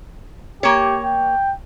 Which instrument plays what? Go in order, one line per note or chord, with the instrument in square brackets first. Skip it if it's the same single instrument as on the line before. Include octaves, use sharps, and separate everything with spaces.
[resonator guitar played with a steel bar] A#3 C#5 [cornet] G4
[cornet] G5